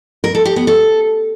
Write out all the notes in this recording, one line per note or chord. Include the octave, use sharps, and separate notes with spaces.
A#4
A4
G4
B3
A4